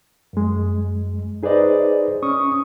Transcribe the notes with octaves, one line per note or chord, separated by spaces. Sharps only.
F#2 G#3
D#4 G#4 B4 C5 D5 D#5
C#4 C#6 D#6